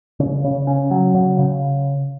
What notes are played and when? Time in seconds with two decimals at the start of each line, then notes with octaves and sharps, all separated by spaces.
0.20 C#3
0.44 C#3
0.67 C#4
0.91 F#3
1.14 C#3
1.39 C#3